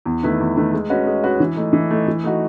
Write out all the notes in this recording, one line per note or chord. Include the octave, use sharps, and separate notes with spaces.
E2
D#3 A3 E4 B4
E2
D#3 A3 E4 B4
G#3
C#4 F#4 B4 D#5
G#3
C#4 F#4 B4 D#5
E3
A3 D#4
E3
A3 D#4
E3
A3 D#4 F#4